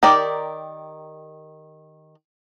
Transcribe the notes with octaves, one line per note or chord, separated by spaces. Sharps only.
D#3 G4 A#4 D5